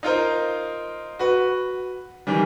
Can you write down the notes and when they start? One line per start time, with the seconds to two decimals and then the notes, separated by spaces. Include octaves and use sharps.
0.03 D#4 F4 A#4 C5
1.19 F#4 B4
2.27 D#3 E3 G3